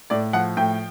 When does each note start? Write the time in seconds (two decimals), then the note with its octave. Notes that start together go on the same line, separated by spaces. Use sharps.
0.10 A2 D5
0.33 F3 F#5
0.57 A2 G5